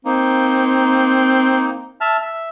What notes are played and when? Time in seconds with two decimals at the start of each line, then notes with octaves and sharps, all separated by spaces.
0.05 A#3 C4 D#4
2.01 E5 A5 F6
2.22 E5